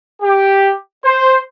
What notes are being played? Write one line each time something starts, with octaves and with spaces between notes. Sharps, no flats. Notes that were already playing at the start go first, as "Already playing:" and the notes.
G4
C5